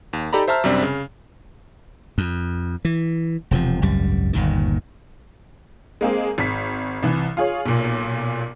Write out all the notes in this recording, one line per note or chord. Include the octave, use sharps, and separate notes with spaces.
D#2
D#4 G4 A4 D5 A#5 B5
C5 E5 A5 A#5 F6
F#2 C3 G3 C4 D4
C#3
F2
E3
E1 C3 F3
G#1 C#2 F#2 G3
G1 D#2 A#2 D#3
G#3 A#3 C4 G#4
G#1 B6
C2 E3
F4 G#4 C#5
B1 A#2